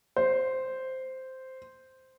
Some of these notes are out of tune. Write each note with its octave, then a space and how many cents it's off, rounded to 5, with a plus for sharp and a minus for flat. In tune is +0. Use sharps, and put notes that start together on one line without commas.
C5 -5